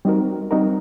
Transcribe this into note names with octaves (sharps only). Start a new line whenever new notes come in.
G3 C4 D#4 F#4 A#4
G3 C4 D#4 F#4 A#4